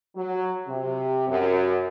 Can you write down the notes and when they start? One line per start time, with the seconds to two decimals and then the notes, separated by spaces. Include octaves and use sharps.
0.16 F#3
0.67 C3
1.27 F#2